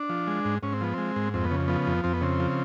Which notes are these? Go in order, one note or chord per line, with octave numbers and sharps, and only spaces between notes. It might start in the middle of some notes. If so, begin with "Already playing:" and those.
Already playing: D4
F3
G#3
G#2
G#2 C#4
C4
F3 B3
G#3 C4
G#2
F2 C4
B3
C#3
F3 B3
F2
F2 C4
B3
C#3 C4
F3